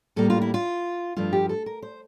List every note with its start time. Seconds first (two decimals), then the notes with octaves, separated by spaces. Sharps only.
0.16 A2 G3 A#3 A4
0.30 F4
0.42 E4
0.54 F4
1.17 G2 F3 A3 F4
1.33 G4
1.49 A4
1.66 A#4
1.82 C5